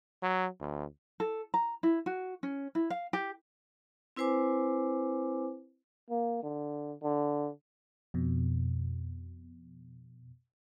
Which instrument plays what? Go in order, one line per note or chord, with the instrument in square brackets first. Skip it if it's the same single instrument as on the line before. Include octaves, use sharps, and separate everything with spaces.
[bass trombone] F#3
D2
[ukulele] A4
A#5
E4
F#4
C#4
E4
F5
G4
[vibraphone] C4 E4 B4 C5 G#5 D6
[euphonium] A#3
D3
D3
[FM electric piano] F2 B2